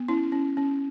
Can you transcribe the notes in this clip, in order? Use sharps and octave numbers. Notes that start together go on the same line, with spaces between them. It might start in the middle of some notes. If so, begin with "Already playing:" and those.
Already playing: B3
C#4 E4
C#4
C#4